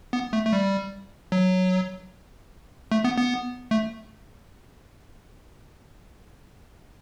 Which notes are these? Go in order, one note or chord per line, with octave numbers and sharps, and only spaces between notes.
B3
A3
A3
G3
F#3
A3
B3
B3
A3